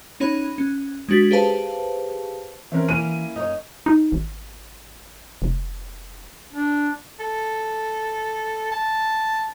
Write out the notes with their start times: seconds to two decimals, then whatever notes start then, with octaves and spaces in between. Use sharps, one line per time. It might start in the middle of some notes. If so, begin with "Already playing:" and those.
0.20 C#4 D#4 C#5 B5
0.58 C#4
1.09 G#3 D4 F#4 A6 B6
1.31 G4 G#4 B4 C5 F5 A5
2.72 E3 C4 C#4 A#4 E5
2.89 A#3 C#4 E4 D#7
3.36 F#2 D#4 C#5
3.86 D#4
4.12 G#1
5.42 F1
6.53 D4
7.20 A4
8.72 A5